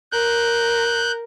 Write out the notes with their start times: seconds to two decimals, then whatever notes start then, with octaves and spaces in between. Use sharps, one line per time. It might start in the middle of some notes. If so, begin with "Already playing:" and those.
0.12 A#4 F#6 G6